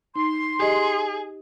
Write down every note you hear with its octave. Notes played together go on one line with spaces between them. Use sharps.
D#4 C6
G4 G#4 D#5